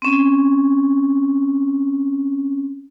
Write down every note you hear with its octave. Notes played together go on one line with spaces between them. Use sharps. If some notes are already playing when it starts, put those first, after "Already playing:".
C4 C#4